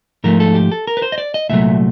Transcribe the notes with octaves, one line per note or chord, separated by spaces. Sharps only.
G#2 F3 A3 A#4
A4
G4
A4
A#4
B4
C5
D#5
D5
D#5
C2 A#2 F#3 A3 E5